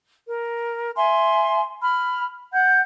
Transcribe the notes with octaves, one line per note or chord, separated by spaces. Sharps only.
A#4
E5 G#5 C6
B5 F6
F#5 G6